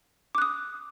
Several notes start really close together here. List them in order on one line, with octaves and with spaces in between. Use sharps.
D6 F#6 D#6